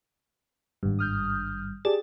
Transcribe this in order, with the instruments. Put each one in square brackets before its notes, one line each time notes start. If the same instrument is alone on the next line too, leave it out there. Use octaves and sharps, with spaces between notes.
[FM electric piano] G#1 G2
[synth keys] D#6 F6 G6
[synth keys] G4 G#4 [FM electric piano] D5 A5 A6